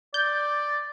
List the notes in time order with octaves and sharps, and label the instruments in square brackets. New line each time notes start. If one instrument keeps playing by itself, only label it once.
[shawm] D5 [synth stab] G6